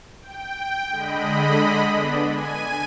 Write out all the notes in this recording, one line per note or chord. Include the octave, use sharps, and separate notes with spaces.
G5
D3 G#3 D#5 B5
B3 D4
G#5 D#7